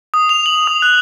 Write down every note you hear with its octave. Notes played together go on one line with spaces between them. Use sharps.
D#6
F7
F#7
D#6
F#6